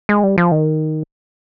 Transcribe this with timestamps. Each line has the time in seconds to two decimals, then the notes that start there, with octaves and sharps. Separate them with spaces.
0.09 G#3
0.23 G3
0.38 F3
0.52 D#3